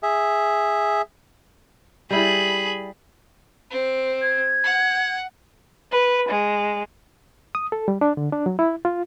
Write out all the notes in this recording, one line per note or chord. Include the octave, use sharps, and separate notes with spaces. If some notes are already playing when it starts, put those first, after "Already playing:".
G#4 E5
G3 E4 G#4 B5
C4
G#6
F#5
B4
G#3
D#6
A4
G3
D4
D3
D4
F#3
E4
F4